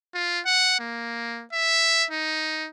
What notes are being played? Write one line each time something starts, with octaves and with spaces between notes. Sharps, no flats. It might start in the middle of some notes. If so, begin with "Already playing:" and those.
F4
F#5
A#3
E5
D#4